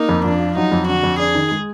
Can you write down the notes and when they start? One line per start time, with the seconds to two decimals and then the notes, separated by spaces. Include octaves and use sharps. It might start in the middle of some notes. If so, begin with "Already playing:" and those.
Already playing: A#3 D#4
0.09 F2
0.24 F3 D4
0.40 F4
0.56 F#3 D#4
0.72 F2
0.87 D3 F#4
1.03 F2
1.19 D4 G#4
1.35 D#3
1.51 G#3